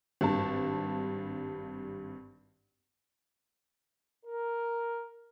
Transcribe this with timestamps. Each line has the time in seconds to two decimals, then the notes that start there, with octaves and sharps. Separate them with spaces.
0.21 G#1 G2 A5
4.26 A#4